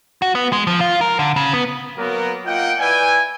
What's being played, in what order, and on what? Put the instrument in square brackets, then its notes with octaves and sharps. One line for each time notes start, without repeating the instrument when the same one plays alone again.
[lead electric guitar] F#4
B3
G#3
F3
F4
A#4
D3
C#3
B3
[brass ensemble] F#3 A#3 B3 A#4
A#3 F4 D#5 F#5 G5
E4 B4 D5 E5 G5 G#5